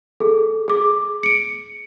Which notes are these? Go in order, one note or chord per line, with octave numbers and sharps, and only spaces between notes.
G#4 A4
G#4 D6
C#7 D7